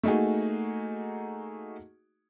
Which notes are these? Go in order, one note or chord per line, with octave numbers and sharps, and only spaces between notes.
A3 A#3 D#4 F#4 G#4